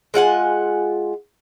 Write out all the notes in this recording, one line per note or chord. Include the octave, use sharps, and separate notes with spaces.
G#3 F4 F#5 G#5